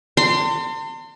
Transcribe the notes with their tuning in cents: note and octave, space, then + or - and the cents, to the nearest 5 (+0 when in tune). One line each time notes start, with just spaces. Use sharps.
A5 +45 C6 -10